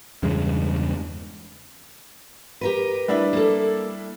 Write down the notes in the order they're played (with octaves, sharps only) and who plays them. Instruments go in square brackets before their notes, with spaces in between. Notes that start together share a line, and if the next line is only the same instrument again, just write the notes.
[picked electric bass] E2 G2 C#3 G#3
[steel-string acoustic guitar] G4 A#4 B4
[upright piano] G3 D4 E4
[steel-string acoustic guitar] A#3 A4